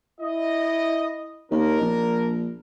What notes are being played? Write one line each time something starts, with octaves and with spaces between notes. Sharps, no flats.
E4 D#5
D#2 D4 A#4
A#1